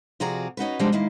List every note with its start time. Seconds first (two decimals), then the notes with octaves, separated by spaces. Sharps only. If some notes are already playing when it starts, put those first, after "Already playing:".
0.20 C3 F3 F#4 G#4 D5 A#5
0.57 C#4 D#4 F#4 B4
0.79 C3 F3 G3 G#3 B3 D4
0.92 D#3 G#3 A#3 E4